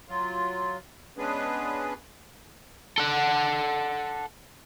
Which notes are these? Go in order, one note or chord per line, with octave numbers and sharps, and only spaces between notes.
F#3 F4
G#3 B3 C#4 D4 G#4 B4
A4 F#5